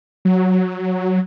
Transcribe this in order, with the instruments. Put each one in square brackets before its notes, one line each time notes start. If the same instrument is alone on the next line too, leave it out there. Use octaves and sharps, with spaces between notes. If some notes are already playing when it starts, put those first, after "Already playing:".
[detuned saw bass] F#3